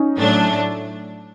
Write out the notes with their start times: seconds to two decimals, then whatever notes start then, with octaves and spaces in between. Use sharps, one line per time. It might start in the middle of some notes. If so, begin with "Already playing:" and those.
Already playing: C#4 D#4
0.18 A2 F#3 A3 D4